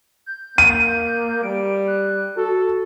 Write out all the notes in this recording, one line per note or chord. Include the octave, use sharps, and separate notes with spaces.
G6
A#3 D#7
G3 D7
F#6
F#4 A4